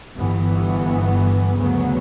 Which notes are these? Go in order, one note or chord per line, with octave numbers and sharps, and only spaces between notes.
G1 G2 E3 B3
D2 C#3 F#3 B3